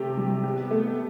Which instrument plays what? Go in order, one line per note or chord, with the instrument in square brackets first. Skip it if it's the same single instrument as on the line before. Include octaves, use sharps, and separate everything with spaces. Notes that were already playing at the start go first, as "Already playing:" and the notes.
Already playing: [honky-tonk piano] C3 G4 [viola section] A3
[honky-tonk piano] G3
[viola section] B3 [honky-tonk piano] G4
[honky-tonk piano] A3